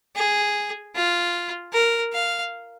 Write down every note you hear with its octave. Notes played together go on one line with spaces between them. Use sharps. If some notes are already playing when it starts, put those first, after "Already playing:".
G#4
F4
A#4
F5